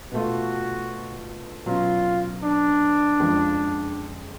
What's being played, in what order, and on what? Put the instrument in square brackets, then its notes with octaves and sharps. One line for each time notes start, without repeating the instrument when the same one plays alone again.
[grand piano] B2 A3 F4 [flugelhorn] F#4
[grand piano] B2 F#3 C#4 [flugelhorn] F4
[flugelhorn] D4
[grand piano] F2 C#3 F3 G#3